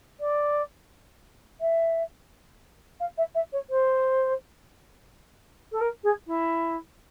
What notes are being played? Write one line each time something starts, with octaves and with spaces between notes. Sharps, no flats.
D5
E5
F5
E5
E5
C#5
C5
A4
A#4
G#4
E4